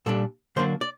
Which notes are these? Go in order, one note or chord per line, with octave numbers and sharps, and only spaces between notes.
A#2 G3 D4 A4
D3 F#3 A#3 D4 C5
D5